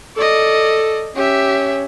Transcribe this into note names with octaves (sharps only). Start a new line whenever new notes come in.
A4 D5 D#5
C#4 G4 E5